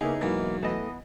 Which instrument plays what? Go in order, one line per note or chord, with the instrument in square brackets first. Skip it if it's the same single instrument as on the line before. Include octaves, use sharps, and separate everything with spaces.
[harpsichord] C#3 [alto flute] A#3 [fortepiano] B3 E4 G#4 [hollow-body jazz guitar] D#4
[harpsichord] B1 E2 G#2 [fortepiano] E3 [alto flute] A#3
[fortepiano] E3 D#5 [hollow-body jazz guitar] A3 [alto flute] B3